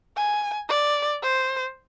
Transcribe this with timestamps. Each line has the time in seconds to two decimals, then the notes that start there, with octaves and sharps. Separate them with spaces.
0.17 G#5
0.69 D5
1.23 C5